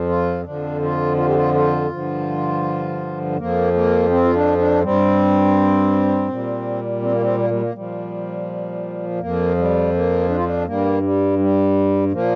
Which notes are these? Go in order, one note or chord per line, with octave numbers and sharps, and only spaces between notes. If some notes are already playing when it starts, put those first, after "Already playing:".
Already playing: F2 F3
F4
F2 D3 F3 D4
F4
F4
G4
F4
F4
G2 D3 F3
F2 F3 A#3
A#3
C4
F4
D4
D4
G2 G3 C4
A#2 G3
C4
A#3
C4
A#3
G3
A#3
A#2 F3 G3
F2 F3 A#3
G3
A#3
D4
F4
D4
G2 G3 A#3
G3
G3
A#2 F3 A#3